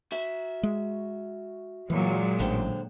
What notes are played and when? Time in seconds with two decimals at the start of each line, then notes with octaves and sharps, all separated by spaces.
0.12 F#4 E5
0.63 G#3
1.90 A#2 E3 F#3 G#3
2.40 A1 D3 C5 G5